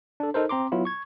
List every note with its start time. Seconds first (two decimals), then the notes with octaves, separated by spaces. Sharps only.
0.20 D4 A4
0.34 D#4 A4 A#4 C5
0.49 C4 A#5 C6 D6
0.72 F#3 B3 E4 F4
0.85 C#6 G#6